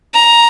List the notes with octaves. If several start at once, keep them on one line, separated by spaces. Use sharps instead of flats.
A#5